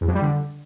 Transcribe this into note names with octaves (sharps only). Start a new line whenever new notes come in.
E2
F2
G3
D3